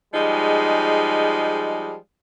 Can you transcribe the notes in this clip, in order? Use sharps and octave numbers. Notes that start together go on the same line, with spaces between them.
F3 G3 G#3 D#4 G#4